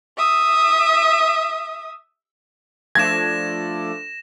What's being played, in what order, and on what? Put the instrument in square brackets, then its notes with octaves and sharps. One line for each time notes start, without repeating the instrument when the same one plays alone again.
[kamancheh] E5 D#6
[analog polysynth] F3 A3 D4 [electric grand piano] G#6 [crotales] A#6 E7